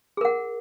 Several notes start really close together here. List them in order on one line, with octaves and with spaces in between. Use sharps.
G#4 A#4 F#5